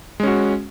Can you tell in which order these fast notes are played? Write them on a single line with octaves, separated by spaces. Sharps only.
G#3 C#4 F#4